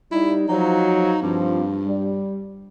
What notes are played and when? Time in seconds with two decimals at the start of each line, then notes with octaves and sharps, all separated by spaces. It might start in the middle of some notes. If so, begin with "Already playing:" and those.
0.12 G3 D#4 E4
0.48 F3 F#3 D#4
1.22 G2 F3 C4
1.85 G3